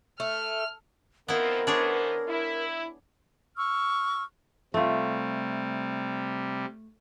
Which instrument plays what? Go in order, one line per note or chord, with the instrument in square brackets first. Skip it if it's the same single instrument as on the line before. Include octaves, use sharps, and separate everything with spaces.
[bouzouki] A3 [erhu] F6
[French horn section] D#3 F3 C4 [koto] B3 E4 [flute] A#4
[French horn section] E3 B3 C5 [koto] D4 G#4 C#5
[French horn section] E4
[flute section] C#6 E6 F6
[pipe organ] C3 G3 [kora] A3 F4